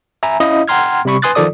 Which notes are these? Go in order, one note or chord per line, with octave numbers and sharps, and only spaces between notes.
E5 G#5 A#5 B5
C#4 E4 D#5 F5 D#6
F#5 G5 A#5 C6 F6 G#6
C3 G3 B5 C#6
B4 G#5 C6 D#6 F#6 A6
D#3 F3 F4 A4 D5 D#6